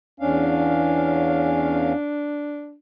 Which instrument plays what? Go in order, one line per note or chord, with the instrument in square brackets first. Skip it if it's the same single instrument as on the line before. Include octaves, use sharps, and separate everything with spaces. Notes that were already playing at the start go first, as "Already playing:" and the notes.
[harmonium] E2 C#4 F5 [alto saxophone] D4